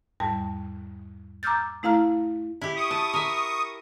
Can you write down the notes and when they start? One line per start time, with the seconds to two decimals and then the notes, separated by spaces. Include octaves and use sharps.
0.20 E2 G#2 G3 A5
1.43 A#5 D6 E6 F6 G6 A6
1.83 A3 E4 F5 A#5 F6
2.62 E4 G4
2.77 C#6 D#6
2.91 A5
3.14 A#4 E5